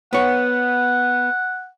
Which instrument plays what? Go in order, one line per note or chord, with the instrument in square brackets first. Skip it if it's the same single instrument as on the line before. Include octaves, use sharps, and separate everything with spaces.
[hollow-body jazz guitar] B3 C#5 [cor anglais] F#5